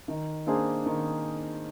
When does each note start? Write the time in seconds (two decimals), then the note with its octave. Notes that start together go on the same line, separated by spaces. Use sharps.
0.08 D#3
0.46 A#3 D4 G#4 C5
0.86 D#3